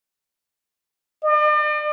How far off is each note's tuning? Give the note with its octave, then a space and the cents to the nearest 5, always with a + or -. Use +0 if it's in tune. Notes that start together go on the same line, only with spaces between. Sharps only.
D5 +45